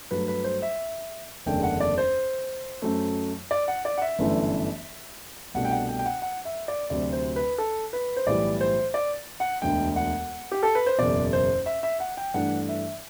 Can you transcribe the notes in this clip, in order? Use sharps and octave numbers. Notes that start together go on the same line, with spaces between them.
G2 F#3 A3 B4
B4
C5
E5
F#1 E2 D3 A3 D4 G5
F#5
D5
C5
F#2 F#3 A3
D5
F#5
D5
F#5
E5
G1 F#2 E3 A3 D4
C2 B2 A3 D4 F#5
G5
F#5
G5
G5
F#5
F#5
E5
D5
D2 C3 F#3 C4 D5
C5
B4
A4
B4
C5
B1 A2 E3 G3 D5
C5
D5
F#5
E1 D2 D3 G5
F#5
G4
A4
B4
C5
F#1 E2 B2 D5
C5
E5
E5
F#5
G5
G2 E3 A3 D4 F#5
E5